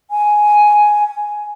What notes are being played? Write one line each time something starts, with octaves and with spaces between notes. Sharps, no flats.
G#5